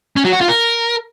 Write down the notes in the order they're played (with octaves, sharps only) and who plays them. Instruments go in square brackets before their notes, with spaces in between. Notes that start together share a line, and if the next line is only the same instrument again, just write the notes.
[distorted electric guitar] C#4
F#3
F#4
F4
A#4